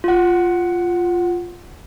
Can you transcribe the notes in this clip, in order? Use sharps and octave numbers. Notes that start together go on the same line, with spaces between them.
F4 F#5